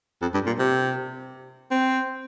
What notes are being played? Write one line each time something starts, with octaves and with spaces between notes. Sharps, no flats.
F2
G2
A#2
C3
C4